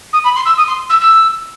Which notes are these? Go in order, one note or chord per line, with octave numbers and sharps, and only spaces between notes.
D#6
B5
C6
E6
D#6
C6
E6
E6